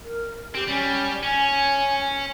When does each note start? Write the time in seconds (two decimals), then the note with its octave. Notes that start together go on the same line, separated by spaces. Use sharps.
0.04 A#4
0.55 C4 G4
0.68 G3 C#4
1.23 C#4 G#5
1.98 G#5